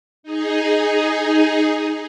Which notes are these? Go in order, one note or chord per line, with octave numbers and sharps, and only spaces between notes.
D#4 G#4